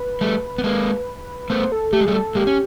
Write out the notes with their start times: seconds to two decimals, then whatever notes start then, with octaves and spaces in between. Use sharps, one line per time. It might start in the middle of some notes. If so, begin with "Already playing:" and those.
Already playing: B4
0.21 G3 A3
0.58 B3
0.64 G#3 A#3
1.50 A3 B3 C5
1.72 A4
1.93 A3 G4
2.00 G#3
2.06 G3 A3 G#4
2.14 A4
2.35 G#3 A#3 G4
2.47 C#4